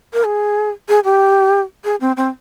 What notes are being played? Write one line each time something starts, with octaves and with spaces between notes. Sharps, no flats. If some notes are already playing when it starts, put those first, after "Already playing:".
A#4
G#4
G#4
G4
G#4
C4
C4